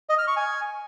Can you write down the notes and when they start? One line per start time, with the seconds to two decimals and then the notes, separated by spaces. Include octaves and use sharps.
0.09 D#5
0.18 F6
0.27 C#6
0.36 G#5